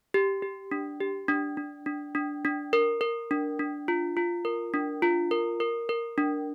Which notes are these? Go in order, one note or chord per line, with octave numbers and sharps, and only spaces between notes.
G4
G4
D4
G4
D4
D4
D4
D4
D4
A#4
A#4
D4
D4
F4
F4
A#4
D4
F4
A#4
A#4
A#4
D4